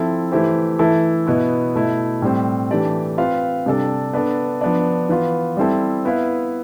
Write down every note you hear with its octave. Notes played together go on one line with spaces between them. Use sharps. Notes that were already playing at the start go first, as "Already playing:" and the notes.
Already playing: F3 C4 E4 A4
E3 A3 E4 G4 C5
E3 A3 E4 A4
B2 B3 E4
B2 A3 E4
A2 G3 C4
E3 A3 D4 G4 D5
C4 F4 B4 F5
C3 G3 D4 A4
B3 D4 A4
F3 B3 D4
E3 B3 F4
G3 C4 E4 A4
B3 E4 B4 F5